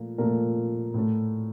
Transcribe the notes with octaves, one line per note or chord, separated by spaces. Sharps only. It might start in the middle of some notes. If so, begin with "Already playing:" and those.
Already playing: A#2 F3 A3
A#2 F3 A3 A#4
A2 A3